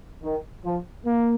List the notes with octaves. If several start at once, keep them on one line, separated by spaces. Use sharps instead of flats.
D#3
F3
A#3